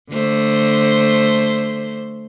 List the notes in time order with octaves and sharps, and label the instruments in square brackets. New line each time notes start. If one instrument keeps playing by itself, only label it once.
[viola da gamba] D3 A3 C5